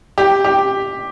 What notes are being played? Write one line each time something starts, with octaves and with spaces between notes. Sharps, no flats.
G4
G4